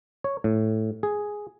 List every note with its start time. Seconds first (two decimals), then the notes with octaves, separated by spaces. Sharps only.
0.24 C#5
0.44 A2
1.03 G#4